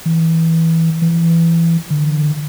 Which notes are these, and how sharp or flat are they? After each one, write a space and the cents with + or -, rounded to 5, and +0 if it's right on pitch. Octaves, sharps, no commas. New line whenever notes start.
E3 -15
E3 +15
D3 +25